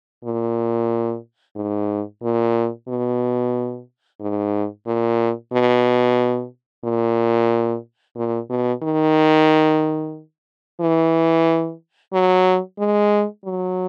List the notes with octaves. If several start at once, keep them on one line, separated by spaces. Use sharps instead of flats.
A#2
G#2
A#2
B2
G#2
A#2
B2
A#2
A#2
B2
D#3
E3
F#3
G#3
F#3